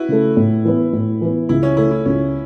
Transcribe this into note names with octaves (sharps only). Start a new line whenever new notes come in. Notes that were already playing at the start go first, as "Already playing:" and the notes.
Already playing: E4 F#4 B4
C#3 A3
A2
E3 B3
A2
E3 B3
C#2 E4
C#4
C#3 A3 E4
E4
C#2 C#4